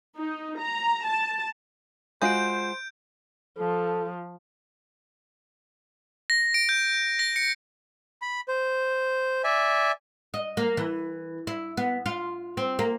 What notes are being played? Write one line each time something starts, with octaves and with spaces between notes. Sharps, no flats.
D#4
A#5
A5
G#3 F4 F#4 C5 G6 D7
F3 A4
A#6
D7
G6
A#6
C#7
B5
C5
D5 E5 G#5
D#5
A#3
E3
E4
B3
F4
C4
A#3